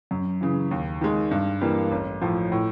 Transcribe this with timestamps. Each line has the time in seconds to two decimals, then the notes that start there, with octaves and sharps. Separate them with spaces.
0.11 F#2
0.41 C#3 E3
0.71 D#2
1.01 D#3 G#3
1.31 G2
1.61 E3 G3 A#3
1.91 A1
2.21 A2 F3
2.52 A2